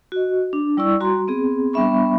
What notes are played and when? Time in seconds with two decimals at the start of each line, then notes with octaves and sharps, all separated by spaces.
0.12 F#4 D#5
0.53 D4
0.77 G3 E4 D5 C#6 E6
1.00 G3 F#4 A#5 C6
1.27 B3 C4 G#4
1.73 G3 B3 D4 E5 B5 C#6